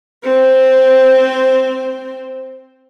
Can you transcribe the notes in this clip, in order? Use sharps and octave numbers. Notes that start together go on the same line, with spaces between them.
C4 C5